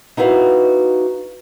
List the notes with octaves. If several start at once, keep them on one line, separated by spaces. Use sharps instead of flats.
D#4 E4 F#4 B4 F5